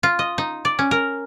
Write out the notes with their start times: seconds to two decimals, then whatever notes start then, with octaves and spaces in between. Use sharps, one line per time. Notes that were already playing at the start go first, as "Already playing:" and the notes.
0.03 F4
0.19 D#5
0.38 D#4
0.65 D5
0.79 C#4
0.91 A#4